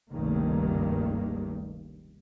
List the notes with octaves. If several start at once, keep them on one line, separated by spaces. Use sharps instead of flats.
F1 C#2 G2 D#3 A3 A#3